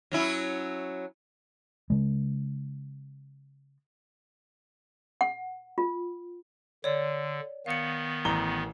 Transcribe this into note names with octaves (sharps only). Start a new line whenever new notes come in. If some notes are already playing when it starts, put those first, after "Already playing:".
F#3 C#4 E4
C#3 G#3
F#5
F4
D3 C#5 D5
D#3 B3 F5 C#7
A1 A#5 G7